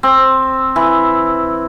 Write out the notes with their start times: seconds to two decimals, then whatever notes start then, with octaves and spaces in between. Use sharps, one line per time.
0.03 C4
0.76 E3